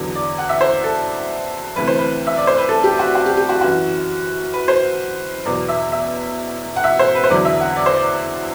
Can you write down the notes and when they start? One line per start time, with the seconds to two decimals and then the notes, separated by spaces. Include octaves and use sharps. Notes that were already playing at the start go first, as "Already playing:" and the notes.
Already playing: E2 D3 F#3
0.15 D5
0.38 F#5
0.49 E5
0.61 C5
0.84 A4
1.76 D2 C3 E3 B4
1.87 C5
1.99 B4
2.27 E5
2.37 D5
2.47 C5
2.58 B4
2.69 A4
2.84 G4
2.99 F#4
3.15 F#4
3.26 G4
3.37 G4
3.49 F#4
3.61 F#2 E3 F#4
4.53 B4
4.68 C5
5.45 E2 B2 F#3 D5
5.69 E5
5.92 E5
6.76 F#5
6.84 E5
6.99 C5
7.15 B4
7.24 C5
7.30 E2 D3 F#3 D5
7.45 E5
7.61 F#5
7.76 D5
7.86 C5
7.97 D5